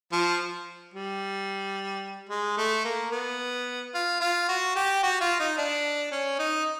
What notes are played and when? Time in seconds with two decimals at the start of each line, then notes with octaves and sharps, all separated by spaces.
0.12 F3
0.94 G3
2.30 G#3
2.58 A3
2.85 A#3
3.12 B3
3.94 F4
4.20 F4
4.49 F#4
4.76 G4
5.03 F#4
5.21 F4
5.39 D#4
5.58 D4
6.12 C#4
6.39 D#4